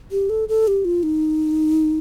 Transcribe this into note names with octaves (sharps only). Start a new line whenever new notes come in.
G4
A4
A4
G4
F4
D#4